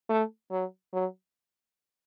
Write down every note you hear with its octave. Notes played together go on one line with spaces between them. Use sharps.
A3
F#3
F#3